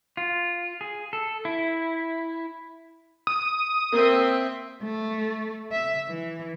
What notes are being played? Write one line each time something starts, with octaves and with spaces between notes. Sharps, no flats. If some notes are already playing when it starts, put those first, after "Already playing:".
F4
G#4
A4
E4
D#6
A#3 C4 E5
A3
E5
E3